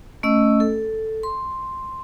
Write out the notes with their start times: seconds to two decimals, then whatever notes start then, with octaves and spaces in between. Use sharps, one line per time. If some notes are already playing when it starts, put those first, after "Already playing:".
0.23 A3 C#4 D#5 E6
0.60 A4
1.23 C6